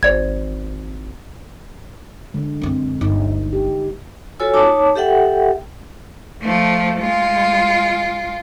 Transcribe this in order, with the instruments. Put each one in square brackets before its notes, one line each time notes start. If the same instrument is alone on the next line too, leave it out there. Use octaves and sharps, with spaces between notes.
[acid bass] G#1 [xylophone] C5 D5 G#6
[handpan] D3 G#3
[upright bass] F#2 C4
[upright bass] G1 D2 [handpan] D#4
[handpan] G4
[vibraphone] F4 F#4 A4 C#5 G#5 E6
D#4 C#5 A5 D6
G4 A4 E5 F#5 G5
[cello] F3 A3
G#3 F4